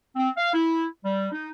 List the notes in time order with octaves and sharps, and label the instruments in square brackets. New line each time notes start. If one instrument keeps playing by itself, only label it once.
[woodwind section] C4
F5
E4
G3
D#4